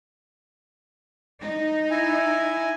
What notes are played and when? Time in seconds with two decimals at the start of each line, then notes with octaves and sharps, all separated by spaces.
1.41 D#4
1.91 E4 G#5